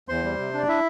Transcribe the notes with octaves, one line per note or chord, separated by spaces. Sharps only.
E2 C5 C6
G3
C3
D4 D5
E4 E5